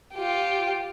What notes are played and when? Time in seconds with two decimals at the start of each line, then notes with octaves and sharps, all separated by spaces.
0.14 F4 G4